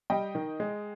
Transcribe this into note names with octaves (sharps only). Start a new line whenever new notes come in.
G3 D#5 G5
D#3
G#3